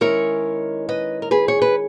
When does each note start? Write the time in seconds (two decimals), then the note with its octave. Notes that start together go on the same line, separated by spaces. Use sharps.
0.01 D#3 G#3 C#4 E4 A#4 C#5
0.89 B4 D#5
1.22 A#4
1.31 G#4 B4
1.48 C#5
1.62 B4